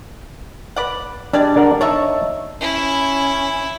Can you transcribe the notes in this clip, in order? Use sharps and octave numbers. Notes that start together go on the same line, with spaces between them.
B4 D5 F#5
G3 G#3 D4 D5
D4 A#4 F#5
D4 D#4 C#5 E5 C#6
C#4 E4